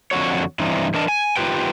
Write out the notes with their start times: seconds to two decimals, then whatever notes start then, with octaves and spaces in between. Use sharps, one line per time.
0.11 F2 D3 F#4 C#5
0.59 G2 E3 C4 D4 D#4
0.94 E3 D4 A#4 D#5 A5
1.08 G#5
1.36 F#2 D#3 F4 G4 B4 G5